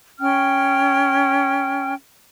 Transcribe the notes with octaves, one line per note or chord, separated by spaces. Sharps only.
C#4 G5 F6